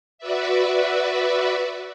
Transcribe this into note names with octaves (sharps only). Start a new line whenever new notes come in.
F#4 B4 D5 E5